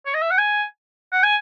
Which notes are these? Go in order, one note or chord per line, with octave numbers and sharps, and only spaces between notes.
C#5
D#5
E5
F#5
G#5
F#5
G#5